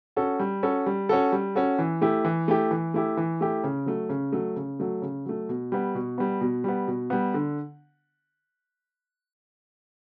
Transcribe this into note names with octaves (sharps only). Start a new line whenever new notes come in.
C#4 F#4 A4
G3
C#4 F#4 A4
G3
C#4 F#4 A4
G3
C#4 F#4 A4
E3
A3 E4 G4
E3
A3 E4 G4
E3
A3 E4 G4
E3
A3 E4 G4
C#3
F#3 A3
C#3
F#3 A3
C#3
F#3 A3
C#3
F#3 A3
B2
G3 B3
B2
G3 B3
B2
G3 B3
B2
G3 B3
D3